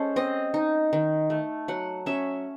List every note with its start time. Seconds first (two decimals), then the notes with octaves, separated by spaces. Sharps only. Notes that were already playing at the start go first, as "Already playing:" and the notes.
Already playing: G#3 C#4 A4 C5
0.16 C4 D#5
0.54 D#4
0.93 D#3
1.30 A3
1.68 F#3 F#5
2.06 C#4 E5